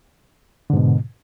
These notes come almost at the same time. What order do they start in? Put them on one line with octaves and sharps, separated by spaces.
D3 G#2 B2